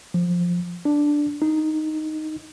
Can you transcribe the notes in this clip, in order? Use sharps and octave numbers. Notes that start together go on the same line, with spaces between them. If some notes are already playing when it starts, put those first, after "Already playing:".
F3
D4
D#4